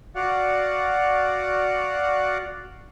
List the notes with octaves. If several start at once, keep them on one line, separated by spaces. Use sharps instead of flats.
F#4 D5 F5 F#5